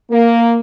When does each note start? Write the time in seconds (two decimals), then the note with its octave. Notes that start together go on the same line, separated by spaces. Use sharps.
0.10 A#3